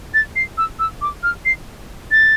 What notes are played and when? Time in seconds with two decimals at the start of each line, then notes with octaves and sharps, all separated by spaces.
0.14 A6
0.36 C7
0.58 E6
0.79 E6
1.01 D6
1.23 F6
1.45 C7
2.11 A6